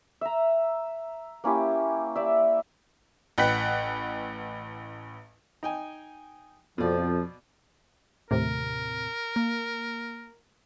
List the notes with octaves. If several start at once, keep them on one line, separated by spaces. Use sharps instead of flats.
E5 A#5
A#3 C#4 E4 G4
G4 D5 E5
A1 B4 F#5 G5 F#6 B6
D#4 G5 G#5
F2 B2 F3 D5
D#2 A2 C3 A#4
A#3